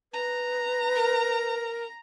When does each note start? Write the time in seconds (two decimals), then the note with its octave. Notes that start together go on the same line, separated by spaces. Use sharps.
0.13 B4 A#5
0.96 A#4